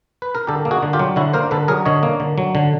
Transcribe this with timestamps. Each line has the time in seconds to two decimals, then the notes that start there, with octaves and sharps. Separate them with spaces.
0.22 B4
0.35 A#4
0.47 D3 G4 A4
0.65 A#3
0.71 F#4 G#4
0.83 D3
0.93 F4 G4
0.99 F#3
1.16 D3 E4 F#4
1.33 A#3 A#4 C5
1.51 D3 A4 B4
1.68 F#3 G#4 A#4
1.85 D3 C#5 D#5
2.03 A#3
2.20 D3
2.38 F#3
2.55 D3